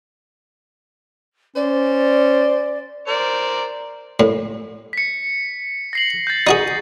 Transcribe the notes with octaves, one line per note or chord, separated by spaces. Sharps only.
C#4 C5 D5
A#4 C5 D5
A2
B6 C#7
A#6 C7 F#7
G6 A6
D#4 F#4 G#4